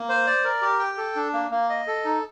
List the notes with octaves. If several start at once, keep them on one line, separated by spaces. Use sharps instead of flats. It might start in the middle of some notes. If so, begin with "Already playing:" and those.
Already playing: A#3
C5
D5
A#4
G4
G5
A4
D4
A#3
A#3
D#5
A4
D#4